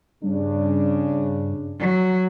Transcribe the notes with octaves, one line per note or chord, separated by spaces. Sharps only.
G2 C#3 D4
F#3